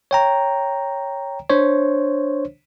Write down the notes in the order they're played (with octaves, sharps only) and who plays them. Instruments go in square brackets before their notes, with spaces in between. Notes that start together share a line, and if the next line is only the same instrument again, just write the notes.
[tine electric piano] C#5 G5 A#5
D4 C5 C#5